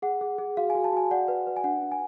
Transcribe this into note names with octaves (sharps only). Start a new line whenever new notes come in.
G#4 F#5
G#4
G#4
F#4 F5
G#5
F#4
A5
F#4 G#5
D5 F#5
B4
B4
G#5
D4 F#5
D4
G#5